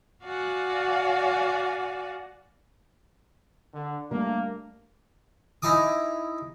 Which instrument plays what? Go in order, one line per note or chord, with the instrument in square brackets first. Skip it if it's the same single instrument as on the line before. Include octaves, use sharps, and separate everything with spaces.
[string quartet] F#4 D5 F5 F#5 G#5
[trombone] D3
[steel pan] G3 A3 D4 [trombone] A#3
[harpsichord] D#4 E4 G#5 D6 D#6